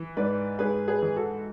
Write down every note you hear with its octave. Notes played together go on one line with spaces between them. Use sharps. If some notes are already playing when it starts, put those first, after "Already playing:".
Already playing: E3
G#2 B4 D5
G#2 G#4 B4
G#4 B4
E3
F#4 A4